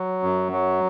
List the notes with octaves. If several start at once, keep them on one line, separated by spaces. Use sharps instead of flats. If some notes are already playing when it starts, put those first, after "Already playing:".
Already playing: F#3
F#2
F#3